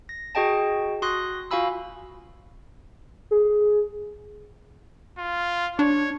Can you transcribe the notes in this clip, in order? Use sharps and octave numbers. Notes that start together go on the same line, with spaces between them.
A#6
F#4 G#4 D#5 G5 A5
F#4 C6 D#6 F#6 A#6
F4 F#4 F5 G#5 B5 E6
G#4
F4
D4 C#5